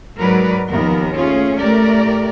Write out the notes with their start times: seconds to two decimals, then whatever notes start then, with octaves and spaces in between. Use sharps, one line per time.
0.18 G#2 F#3 G#3 A#4 B4 D5
0.70 D#2 F3 B3 A#4
1.16 A3 C#4 F4 G#4
1.60 A2 A3 G4 A#4 D5